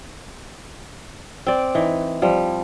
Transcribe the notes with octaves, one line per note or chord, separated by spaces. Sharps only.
C4 D5
E3 D#4
F3 G3